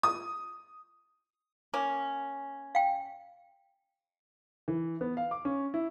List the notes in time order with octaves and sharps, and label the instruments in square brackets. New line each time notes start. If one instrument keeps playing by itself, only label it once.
[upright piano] D#6
[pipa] A#3 C#4
[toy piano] F5 G5
[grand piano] E3
B3
F5
D6
C#4
E4